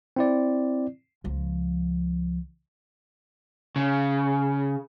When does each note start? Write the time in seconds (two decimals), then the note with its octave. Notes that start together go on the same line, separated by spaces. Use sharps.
0.16 C4 E4 D5
1.24 C#2 F3
3.76 C#3